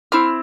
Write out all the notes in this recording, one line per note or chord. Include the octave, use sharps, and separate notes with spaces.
C4 E4 F6